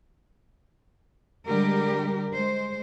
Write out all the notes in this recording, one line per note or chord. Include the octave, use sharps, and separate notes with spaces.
D3 G3 G#3 G4 A#4
G#3 C5